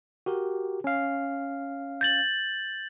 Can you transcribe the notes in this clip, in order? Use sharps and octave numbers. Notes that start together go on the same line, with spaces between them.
F#4 G4 A#4
C#4 F5
G6 A6 F#7